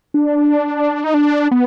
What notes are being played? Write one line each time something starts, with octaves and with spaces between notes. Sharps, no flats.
D4
D#4
D4
B3